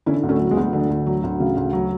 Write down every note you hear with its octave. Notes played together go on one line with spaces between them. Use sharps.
D3 C#4 E4
D2
A3 C#4
F#3
G#3 B3
D2
D3
D2
F#3
D2
C#3
D2
F#3